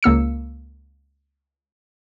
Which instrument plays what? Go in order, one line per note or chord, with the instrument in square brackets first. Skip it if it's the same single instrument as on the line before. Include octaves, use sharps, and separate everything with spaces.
[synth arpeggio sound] C#2 A#3 E6 C#7